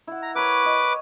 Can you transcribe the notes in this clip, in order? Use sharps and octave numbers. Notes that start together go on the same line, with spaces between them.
E4 F#5
A#5
A#4 B4 C#5 D6
D#5